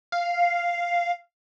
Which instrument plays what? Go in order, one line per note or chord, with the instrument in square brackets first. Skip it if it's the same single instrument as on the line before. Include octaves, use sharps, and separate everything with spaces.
[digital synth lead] F5